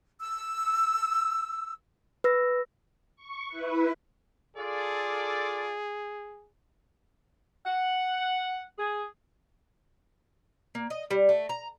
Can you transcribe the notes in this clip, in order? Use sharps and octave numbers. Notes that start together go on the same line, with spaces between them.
E6
B4 E6 A#6
C#6
E4 B4
F4 G#4 A4 D5
F#5
G#4
A#3
D#5
G3
A3
A#5